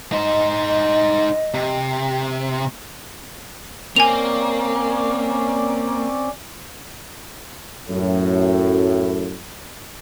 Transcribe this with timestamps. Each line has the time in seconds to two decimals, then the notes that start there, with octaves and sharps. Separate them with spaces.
0.12 D#4 C5 D#5
1.54 C3
3.96 A#3 C4 C#4 D5 G#5 F7
7.89 F#2 A2